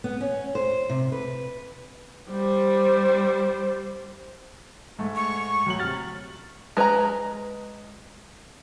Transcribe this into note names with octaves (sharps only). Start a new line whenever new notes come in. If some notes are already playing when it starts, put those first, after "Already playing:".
B3
C#4
C5
C3
B4
G3 C5
G#2 A3
C#6
D2 F#3 F#7
C3 F6 A6
G#3 B4 C5 A#5